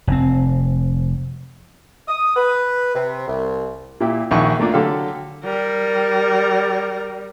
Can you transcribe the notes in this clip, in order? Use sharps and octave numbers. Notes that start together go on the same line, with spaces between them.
F1 C4
D#6
B4
C3
C2
A#2 A#3 E4 G4
A#1 D#3 E5 F#5 G#5 C#6
A3 A#3 D4 F4
D3 F#3 G4 A4 F5
G3 A#4